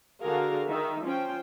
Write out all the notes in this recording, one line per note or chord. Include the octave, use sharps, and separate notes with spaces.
D3 F#4 G#4 A#4 F5
D#3 D#4 E5
F3 C#4 C5 G5